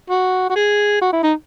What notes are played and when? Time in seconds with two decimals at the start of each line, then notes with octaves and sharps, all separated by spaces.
0.09 F#4
0.50 F#4
0.55 G#4
1.01 F#4
1.13 E4
1.23 D#4